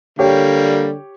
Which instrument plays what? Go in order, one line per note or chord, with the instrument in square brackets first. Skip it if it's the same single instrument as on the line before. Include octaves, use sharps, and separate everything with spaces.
[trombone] D3 [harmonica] G3 A#3 [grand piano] G4 C#5 G5